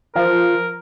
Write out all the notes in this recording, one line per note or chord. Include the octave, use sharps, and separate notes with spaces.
F3 A#4